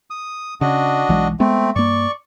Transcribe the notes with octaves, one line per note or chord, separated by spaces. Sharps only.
D#6
C#3 D4 F#4 D#5
B1 E3 G#3
G#3 A3 B3 C4
G2 A#3 D5 C#6